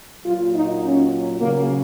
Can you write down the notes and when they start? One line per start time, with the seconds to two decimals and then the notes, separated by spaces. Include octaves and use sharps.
0.25 A#2 F#3 F4
0.53 D#4
0.83 C#4
1.40 C#3 F#3 A#3